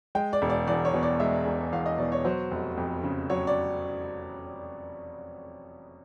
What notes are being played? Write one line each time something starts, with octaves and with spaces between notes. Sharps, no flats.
G#3 G5
D5
E1
D5
E2 D5
C#5
B2
D5
G#3 E5
E1
E2 F5
D#5
B2 D5
C#5
F#3 C5
F1
F2
C#3
F#3 C#5
D5